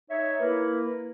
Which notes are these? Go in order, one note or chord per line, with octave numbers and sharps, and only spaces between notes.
D#4 C#5 E5
A#3 E4 A#4 B4